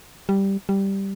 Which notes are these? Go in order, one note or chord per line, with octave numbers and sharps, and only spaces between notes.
G3
G3